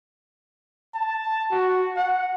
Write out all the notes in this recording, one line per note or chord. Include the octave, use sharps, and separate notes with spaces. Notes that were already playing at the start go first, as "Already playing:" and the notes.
A5
F#4
F#5